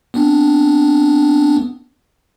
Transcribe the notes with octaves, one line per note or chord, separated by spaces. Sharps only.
B3 C4 D4